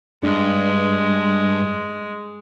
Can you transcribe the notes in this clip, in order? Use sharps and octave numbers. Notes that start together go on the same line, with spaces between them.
G2 G#3 D4